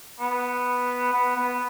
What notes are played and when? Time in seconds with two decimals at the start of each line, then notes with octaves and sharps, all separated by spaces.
0.20 B3
1.13 B3
1.36 B3